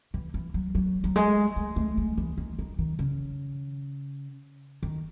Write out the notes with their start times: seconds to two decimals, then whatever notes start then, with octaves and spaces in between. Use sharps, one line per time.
0.14 E3
0.34 E3
0.54 F#3
0.75 F#3
1.04 F#3
1.16 G#3
1.56 G#3
1.76 A3
1.97 G#3
2.18 E3
2.37 D#3
2.59 D#3
2.79 D#3
2.99 C#3
4.83 D#3